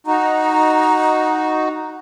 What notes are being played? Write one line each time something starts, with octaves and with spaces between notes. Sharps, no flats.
D#4 F#4 A#5